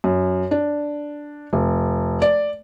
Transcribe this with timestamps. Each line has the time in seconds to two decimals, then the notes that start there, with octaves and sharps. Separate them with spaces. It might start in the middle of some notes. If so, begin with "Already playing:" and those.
0.04 F#2
0.51 D4
1.53 F1
2.22 D5